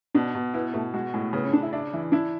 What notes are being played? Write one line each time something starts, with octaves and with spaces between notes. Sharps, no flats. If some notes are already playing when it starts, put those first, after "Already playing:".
B2 D4
B2
B3 E4
B2 A3
G#3 F#4
A2 G#3
C#3 B3
C#4
C#3 D4
E4
D4 E4
E3 E4
D4 E4